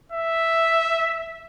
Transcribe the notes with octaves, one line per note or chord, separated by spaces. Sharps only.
E5